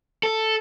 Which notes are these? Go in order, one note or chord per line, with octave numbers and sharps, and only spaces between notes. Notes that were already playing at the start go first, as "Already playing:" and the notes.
A4